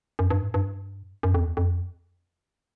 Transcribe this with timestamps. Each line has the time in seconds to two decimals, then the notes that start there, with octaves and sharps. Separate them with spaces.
0.19 F#2
0.30 G2
0.41 G#2
0.54 G2
1.23 F#2
1.34 F2
1.40 E2
1.57 F2